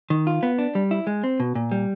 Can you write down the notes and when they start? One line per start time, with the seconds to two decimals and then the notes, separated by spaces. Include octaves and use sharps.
0.10 D#3
0.27 F4
0.43 B3
0.58 D4
0.75 G3
0.91 E4
1.07 G#3
1.24 C4
1.40 B2
1.55 A#2
1.71 G3